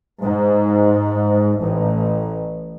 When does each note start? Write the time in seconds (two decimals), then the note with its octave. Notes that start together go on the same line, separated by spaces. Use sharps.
0.22 G#2
1.59 A1